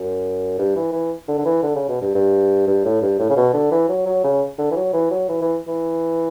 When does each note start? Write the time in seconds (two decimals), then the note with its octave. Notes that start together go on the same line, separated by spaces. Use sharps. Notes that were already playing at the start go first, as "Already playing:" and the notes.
Already playing: F#2
0.58 G2
0.76 E3
0.92 E3
1.28 D3
1.38 D3
1.45 E3
1.62 D3
1.75 C#3
1.88 B2
2.01 G2
2.14 G2
2.67 G2
2.84 A2
3.01 G2
3.19 A2
3.30 C#3
3.36 B2
3.53 D3
3.71 E3
3.89 F#3
4.06 F#3
4.24 C#3
4.58 D3
4.71 E3
4.76 F#3
4.93 E3
5.11 F#3
5.28 E3
5.41 E3
5.67 E3